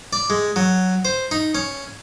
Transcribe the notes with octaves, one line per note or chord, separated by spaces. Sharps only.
D5
G#3
F#3
C5
D#4
C#4